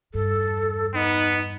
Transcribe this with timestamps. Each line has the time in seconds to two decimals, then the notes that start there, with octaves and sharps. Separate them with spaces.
0.14 E2 G2 A4
0.94 B3 D#4